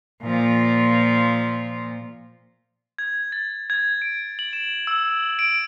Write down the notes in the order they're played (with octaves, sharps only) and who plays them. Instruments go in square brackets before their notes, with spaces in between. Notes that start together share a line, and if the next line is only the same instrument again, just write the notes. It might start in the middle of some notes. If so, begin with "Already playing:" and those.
[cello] A#2 F3
[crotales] G#6
A6
G#6
D7
F#7
E7
E6
D7